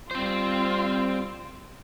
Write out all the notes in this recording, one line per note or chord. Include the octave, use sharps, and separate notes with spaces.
G3 C4 F4 C5